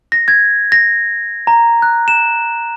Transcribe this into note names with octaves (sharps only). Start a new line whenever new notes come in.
A#6
G#6
A#6
A#5
F#6
E7